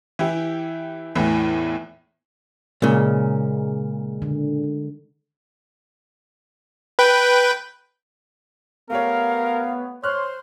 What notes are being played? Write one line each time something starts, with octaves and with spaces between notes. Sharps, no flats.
E3 E4 G4
E2 A2 E3
A#2 C#3 G#3 A#4
D3
B4 G5
A3 B3 G4 A#4 C#5 F5
C5 C#5 C6 F6 F#6